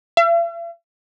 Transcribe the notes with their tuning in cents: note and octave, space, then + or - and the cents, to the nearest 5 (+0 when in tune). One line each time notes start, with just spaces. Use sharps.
E5 +45